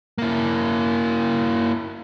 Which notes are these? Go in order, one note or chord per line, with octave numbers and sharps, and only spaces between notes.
A#3 E4